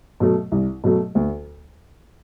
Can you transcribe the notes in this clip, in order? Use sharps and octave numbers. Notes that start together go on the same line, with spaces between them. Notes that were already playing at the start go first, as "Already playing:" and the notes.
B2 F#3 A3
C2
B2 F#3 A3
D2